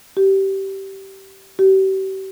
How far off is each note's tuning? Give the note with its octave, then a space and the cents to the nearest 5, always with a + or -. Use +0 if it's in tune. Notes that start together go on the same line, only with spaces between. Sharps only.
G4 -20
G4 -40